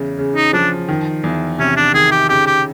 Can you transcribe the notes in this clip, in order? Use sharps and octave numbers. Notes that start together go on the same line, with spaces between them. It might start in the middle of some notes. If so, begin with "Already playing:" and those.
Already playing: E2 C#3
C#3
D#4
F3 D4
D#3
E2
C3 C#4
D4
D#3 G#4
G4
C#3 G4
G4